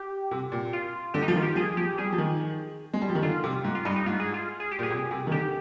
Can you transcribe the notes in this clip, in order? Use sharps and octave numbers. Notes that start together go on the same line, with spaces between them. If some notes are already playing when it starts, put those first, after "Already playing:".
Already playing: G4
C3
A#2
F4
D3 G4
D#4
F3 F4
D#3
G4
F3 G#4
F3 G4
G3 G#4
F3
D#3
G#3
G3
F3
D#3
D3 F4
C3
G#2
F4
G2 D#4
D#4
G#2 F4
G#4
F4
G#4
G4
A#2 G#4
C3
C3
D#3
D3 G4